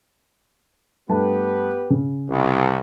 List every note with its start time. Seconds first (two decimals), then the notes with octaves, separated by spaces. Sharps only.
1.09 G2 A3 B3 G4 B4 A5
1.90 C#3
2.30 C2